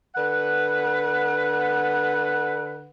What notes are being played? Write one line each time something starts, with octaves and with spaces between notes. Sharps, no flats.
D3 B4 F#5